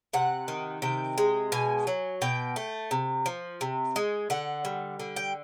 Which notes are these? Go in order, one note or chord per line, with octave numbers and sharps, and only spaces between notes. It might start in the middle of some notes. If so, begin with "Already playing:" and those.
C3 F#5
D#3
C3 G5
G#3
B2 G#5
F#3
B2 G5
A3
C3
F3
C3
G#3
D3 F#5
G3
D3
G5